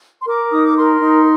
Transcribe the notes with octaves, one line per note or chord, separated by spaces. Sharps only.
C6
A#4 D6
D#4 D#6
D6
A#4 C6
D#4